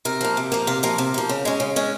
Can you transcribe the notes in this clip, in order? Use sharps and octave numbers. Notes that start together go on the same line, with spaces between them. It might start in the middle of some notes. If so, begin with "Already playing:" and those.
C3 A#4
F3 A#3
C3
F3 A#3
C3 F5
F3 A#3
C3
F3 A#3
C#3
G#3 C#4
C#3
G#3 C#4